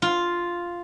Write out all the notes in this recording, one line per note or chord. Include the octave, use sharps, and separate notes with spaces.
F4